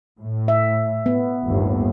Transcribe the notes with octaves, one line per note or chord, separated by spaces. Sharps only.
A2
E5
B3
G1 D#2 A2